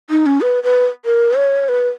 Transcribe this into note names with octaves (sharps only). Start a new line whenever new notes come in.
D#4
C#4
B4
B4
A#4
C#5
B4